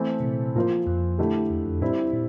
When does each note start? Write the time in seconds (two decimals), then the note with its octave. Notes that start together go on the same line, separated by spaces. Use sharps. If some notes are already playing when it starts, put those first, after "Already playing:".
Already playing: E3 A3 C4 E4 A4
0.20 C3
0.24 A#2
0.56 A2 F3 A#3 F4 C5
0.87 F2
1.18 D3 A3 E4 G4
1.50 E2
1.66 F2
1.81 A2 G3 C4 E4
2.13 A#2